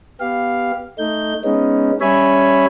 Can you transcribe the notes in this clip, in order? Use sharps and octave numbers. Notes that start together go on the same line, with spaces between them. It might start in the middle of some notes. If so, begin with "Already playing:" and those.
B3 G4 F5
A3 D#4 G6
G#3 B3 C#4 D#4
G3 C#4 C#5 E5 G#5 B5